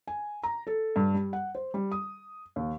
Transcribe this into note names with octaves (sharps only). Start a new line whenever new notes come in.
G#5
A#5
A4
G2
G3
F#5
C5
G3
D#6
D#2